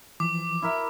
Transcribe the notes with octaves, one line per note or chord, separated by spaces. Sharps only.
E3 F3 D6
E4 A#4 E5